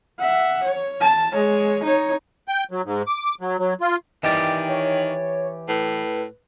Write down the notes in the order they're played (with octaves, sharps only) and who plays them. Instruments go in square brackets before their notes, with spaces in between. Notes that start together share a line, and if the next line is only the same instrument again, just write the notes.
[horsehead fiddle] E5 F#5
C#5
A5
G#3 C#5
D#4 C#5
[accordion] G5
F#3
G#2
D6
F#3
F#3
F4
[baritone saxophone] D#3 [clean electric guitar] E3 G4 D5 [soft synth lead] D#5
[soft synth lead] C#5
[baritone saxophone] A2 [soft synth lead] B4